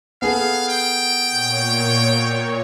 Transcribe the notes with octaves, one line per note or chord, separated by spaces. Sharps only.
B3 G#4 A4 F5
G5
A#2 C#5